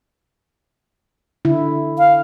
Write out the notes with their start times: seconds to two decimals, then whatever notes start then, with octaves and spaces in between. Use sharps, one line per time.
1.45 D3 E4
1.98 F5